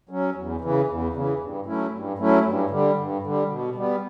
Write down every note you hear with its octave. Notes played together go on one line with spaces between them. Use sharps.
F#3 C#4
E2
C#3 E3
E2
C#3 E3
G2
F#3 A3 C#4 E4
G2
F#3 A3 C#4 E4
G2
D3 G3
G2
D3 G3
B2
G3 B3